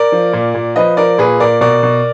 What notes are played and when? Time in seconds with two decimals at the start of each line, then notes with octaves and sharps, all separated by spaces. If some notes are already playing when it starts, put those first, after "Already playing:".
Already playing: A#4 D5
0.12 F3
0.33 A#2
0.55 A#2
0.76 F3 B4 D#5
0.97 F3 A#4 D5
1.18 A#2 G#4 B4
1.40 A#2 A#4 D5
1.61 B2 A#4 D5
1.83 B2